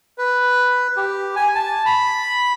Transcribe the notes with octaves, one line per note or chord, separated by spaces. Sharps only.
B4
G4
G#5
A5
B5